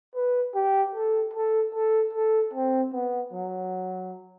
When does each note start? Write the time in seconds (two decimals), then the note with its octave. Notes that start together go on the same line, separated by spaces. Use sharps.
0.15 B4
0.55 G4
0.95 A4
1.34 A4
1.74 A4
2.13 A4
2.54 C4
2.93 B3
3.33 F#3